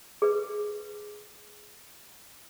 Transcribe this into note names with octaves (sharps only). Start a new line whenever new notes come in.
G#4 B4